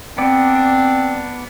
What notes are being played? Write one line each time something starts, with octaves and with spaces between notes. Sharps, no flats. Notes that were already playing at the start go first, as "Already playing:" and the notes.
B3 C4 D4 D5